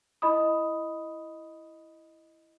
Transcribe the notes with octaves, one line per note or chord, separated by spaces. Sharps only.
E4 D#5 B5 D#6